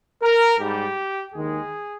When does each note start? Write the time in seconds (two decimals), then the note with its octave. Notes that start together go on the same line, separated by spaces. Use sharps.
0.22 A#4
0.59 G#2 G3 G4
1.33 D#2 D#3 G#3 G#4